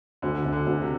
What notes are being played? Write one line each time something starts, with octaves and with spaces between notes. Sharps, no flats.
D2 D3
D2
D3
D2
C3